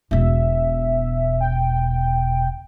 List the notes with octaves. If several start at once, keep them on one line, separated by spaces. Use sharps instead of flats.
E1 B2 E5
G5